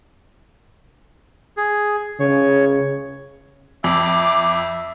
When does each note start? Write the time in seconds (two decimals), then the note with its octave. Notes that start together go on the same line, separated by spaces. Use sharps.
1.57 G#4
2.20 C#3 C#5
3.84 F2 E5 D6